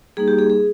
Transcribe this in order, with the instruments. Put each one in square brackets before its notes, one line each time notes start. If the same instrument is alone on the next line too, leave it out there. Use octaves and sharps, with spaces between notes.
[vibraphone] G3 A#3 D#4 G#4
G4
G#4
G#4